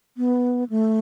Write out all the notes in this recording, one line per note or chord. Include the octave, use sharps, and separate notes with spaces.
B3
A3